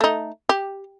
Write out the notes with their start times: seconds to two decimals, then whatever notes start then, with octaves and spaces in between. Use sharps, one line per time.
0.01 A3 D#4
0.49 G4